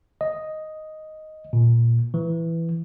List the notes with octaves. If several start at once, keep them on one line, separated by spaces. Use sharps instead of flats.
D#5
A#2
E3